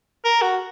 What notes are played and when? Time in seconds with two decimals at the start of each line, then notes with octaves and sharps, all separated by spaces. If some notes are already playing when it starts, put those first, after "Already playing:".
0.25 A#4
0.42 F#4